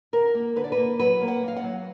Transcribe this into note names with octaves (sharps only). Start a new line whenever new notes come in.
D3 A#4
A#3
D3 B4
D5
B4
A#3
F#3 B4
A#3
F#5
A#3
F5
F#5
F#3